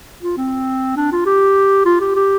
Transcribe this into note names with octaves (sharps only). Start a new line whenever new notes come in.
F4
C4
D4
F4
G4
F4
G4
G4